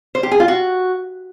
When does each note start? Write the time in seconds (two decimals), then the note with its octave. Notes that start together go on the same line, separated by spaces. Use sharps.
0.15 C5
0.23 G4
0.31 G#4
0.40 F4
0.48 F#4